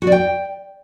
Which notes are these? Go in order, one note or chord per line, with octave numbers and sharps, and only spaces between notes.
F#4
D5
G5